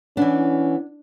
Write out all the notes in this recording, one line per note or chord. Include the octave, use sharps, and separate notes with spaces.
E3 B3 C#4 D4